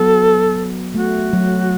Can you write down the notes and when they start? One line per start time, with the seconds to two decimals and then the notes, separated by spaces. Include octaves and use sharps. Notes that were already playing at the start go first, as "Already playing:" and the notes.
Already playing: F#3 B3 A4
0.94 A3 F#4
1.33 F#3